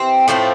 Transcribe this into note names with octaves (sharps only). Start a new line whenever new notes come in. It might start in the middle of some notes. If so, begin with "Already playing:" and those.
Already playing: C3 E3 C4
A2 F3 A3 C4